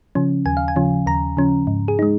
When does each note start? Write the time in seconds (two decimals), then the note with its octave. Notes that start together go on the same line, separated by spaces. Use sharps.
0.15 C#3 F3 C#4
0.46 D#2 G#5
0.57 F5
0.68 G#5
0.76 C#3 F3 C#4
1.06 D#2 A#5
1.37 C#3 F3 C#4
1.67 G#2
1.88 G#4
1.99 G#3 D#4